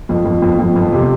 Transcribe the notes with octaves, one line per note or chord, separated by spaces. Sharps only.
F2
F2
F2
F2
F2
C3